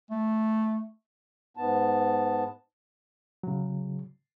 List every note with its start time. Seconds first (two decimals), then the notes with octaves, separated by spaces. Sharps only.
0.11 A3
1.57 G#2 B3 A5
3.43 C#3 F#3